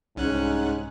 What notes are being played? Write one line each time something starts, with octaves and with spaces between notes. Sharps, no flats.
C2 G#2 C#4 F#6